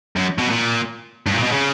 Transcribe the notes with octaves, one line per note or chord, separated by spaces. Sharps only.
F#2
B2
A#2
G2
A#2
B2
C#3